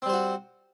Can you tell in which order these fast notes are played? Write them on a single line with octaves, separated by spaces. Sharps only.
C4 G3 C5 F#4